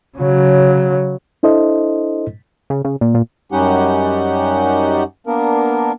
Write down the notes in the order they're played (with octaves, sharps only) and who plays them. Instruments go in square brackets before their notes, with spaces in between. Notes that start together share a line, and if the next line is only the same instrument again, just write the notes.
[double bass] C#3 F#3
[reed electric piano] D4 E4 A4 C5 D#5
[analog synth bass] C#3
C#3
A#2
A#2
[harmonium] F#2 G3 C#4 D#4 G4 F#5
A#3 B3 D4 A#4